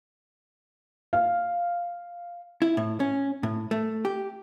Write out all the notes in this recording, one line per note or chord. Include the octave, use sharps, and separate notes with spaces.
F5
E4
A2
C#4
A2
A3
G4